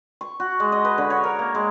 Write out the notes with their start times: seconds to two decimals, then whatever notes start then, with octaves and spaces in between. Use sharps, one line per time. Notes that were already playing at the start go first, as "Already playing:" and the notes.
0.21 C#6
0.40 F#4
0.60 G#3
0.72 D#5
0.85 B4
0.98 D3
1.10 C#5
1.24 A#4
1.39 A#3
1.55 G#3